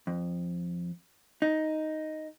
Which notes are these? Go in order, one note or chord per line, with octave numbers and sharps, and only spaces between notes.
F2
D#4